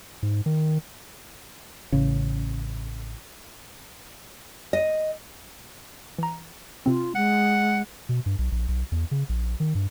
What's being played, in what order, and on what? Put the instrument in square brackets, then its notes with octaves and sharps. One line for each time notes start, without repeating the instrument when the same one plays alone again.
[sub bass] G#2
D#3
[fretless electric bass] A1 C#3
[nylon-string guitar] D#5
[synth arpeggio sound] E3 A#5
[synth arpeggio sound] C3 C4 [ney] F4
[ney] G#3 [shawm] F#5
[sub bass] B2
G2
B1
A#1
B1
E2
C#3
A#1
D#3
G2